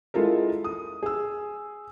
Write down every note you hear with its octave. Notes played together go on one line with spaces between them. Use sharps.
G#3 E4 F4 A4 A#4
D#6
G#4 E6